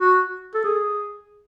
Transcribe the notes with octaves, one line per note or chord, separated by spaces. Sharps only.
F#4
A4
G#4